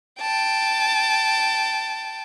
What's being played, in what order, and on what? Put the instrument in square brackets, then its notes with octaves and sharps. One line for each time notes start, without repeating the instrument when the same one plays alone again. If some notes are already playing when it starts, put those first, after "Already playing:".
[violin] G5 A5